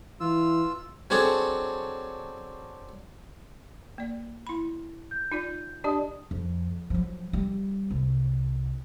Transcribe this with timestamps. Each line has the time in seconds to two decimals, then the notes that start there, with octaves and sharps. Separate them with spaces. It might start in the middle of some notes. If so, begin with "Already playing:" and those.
0.20 E3 F4 E6
1.10 F#3 C4 D4 G#4 A4 C#5
3.98 A#3 D5
4.47 E4 B5
5.11 G6
5.32 D#4 F4 D5
5.84 D4 G4 D5 D#5 A5 D#6
6.31 F2
6.90 F3 F#3
7.33 G3
7.91 C2